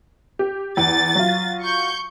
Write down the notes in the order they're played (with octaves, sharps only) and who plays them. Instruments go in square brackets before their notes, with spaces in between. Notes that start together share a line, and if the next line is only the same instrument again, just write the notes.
[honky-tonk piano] G4
[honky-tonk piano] E2 [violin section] A6
[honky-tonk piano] F#3 F4
[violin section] C#6 G6